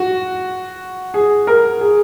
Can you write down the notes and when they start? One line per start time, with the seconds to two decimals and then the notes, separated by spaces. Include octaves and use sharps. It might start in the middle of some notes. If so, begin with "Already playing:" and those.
Already playing: F#4
1.14 G#4
1.47 A#4
1.81 G#4